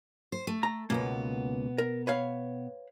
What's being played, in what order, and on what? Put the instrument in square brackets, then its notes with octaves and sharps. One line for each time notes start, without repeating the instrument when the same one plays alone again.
[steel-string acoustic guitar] C5
A3
[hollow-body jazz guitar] A#5
[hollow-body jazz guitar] C#2 A#3 [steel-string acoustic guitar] B2 B3
[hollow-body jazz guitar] A#4
B4 C#5 F5